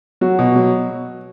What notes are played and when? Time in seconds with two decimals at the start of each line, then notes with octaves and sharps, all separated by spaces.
0.21 F#3 F#4
0.39 B2
0.56 F#3